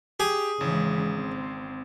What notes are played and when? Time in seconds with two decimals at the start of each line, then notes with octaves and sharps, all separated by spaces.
0.20 G4 G#4
0.61 G#1 C#3 E3 G#3
1.16 C4